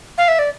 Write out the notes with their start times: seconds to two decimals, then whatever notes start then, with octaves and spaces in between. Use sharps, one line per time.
0.18 F5
0.28 E5
0.39 D5